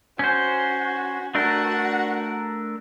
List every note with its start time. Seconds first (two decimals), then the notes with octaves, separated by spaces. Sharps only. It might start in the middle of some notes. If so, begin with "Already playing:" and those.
0.19 C#4 F#4 C5
1.35 A3 D4 F#4 A#4 F#5